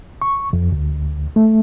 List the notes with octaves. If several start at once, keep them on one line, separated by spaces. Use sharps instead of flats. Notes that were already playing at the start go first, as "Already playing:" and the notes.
C#6
F2
D2
A3